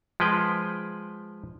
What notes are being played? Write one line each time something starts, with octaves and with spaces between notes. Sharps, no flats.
F3 G#3 B4 G5